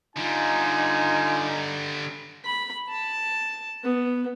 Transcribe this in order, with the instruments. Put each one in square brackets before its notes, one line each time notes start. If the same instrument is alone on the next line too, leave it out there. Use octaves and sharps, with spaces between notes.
[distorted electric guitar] D3 G3 [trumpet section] D#4 F4 G#5
[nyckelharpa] B5
A5
B3